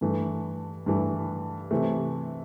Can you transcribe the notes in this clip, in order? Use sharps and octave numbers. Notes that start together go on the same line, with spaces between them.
G2 E3 A3
G2 E3 A3
C3 E3 A3